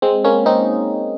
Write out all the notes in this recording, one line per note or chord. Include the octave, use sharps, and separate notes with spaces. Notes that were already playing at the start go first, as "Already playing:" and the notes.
G#3 C4
A#3 C#4
C4 D#4